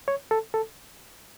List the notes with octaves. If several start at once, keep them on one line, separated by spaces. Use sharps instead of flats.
C#5
A4
A4